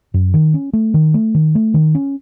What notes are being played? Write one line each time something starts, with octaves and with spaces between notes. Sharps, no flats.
F#2
D#3
C#4
A3
D#3
A3
D#3
A3
D#3
C#4